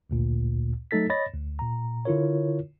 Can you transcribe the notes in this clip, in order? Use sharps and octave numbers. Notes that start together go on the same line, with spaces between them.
A1 D2 A#2
F#3 A3 D#4 A4 A6 B6
C#5 D#5 B5 A6 A#6
D2
A#2 A#5
D3 E4 F4 A#4 C#5